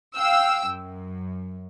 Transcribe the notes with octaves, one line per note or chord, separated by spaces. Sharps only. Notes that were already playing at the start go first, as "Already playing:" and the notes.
F5 G5 E6
F#2